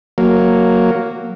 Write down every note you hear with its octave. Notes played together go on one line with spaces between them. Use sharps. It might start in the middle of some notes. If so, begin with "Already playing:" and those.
F#3 A#3